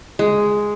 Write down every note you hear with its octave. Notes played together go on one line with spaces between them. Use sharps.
G#3